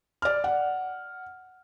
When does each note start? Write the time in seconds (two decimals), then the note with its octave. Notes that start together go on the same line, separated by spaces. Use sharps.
0.22 D5 F6
0.44 F#5